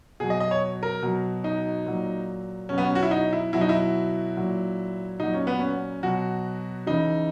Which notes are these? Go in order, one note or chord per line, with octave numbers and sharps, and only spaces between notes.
B2 F#3 G#4
D#5
D#5
C#5
A#4
B2 F#3
D#4
A#2 F#3
B2 F#3 C#4
B3
C#4
F#4
E4
D#4
E4
B2 F#3 E4
D#4
E4
A#2 F#3
A#2 F#3 D#4
C#4
B3
C#4
B2 F#3 F#4
C#3 E3 D#4